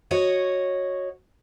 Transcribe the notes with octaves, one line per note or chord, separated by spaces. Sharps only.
F#4 C#5 D#5